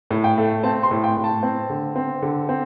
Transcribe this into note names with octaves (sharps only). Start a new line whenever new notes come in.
A2
G5
A3
C4 A5
C6
A2
G5
A2
A5
C4
D3
C4
D3
C4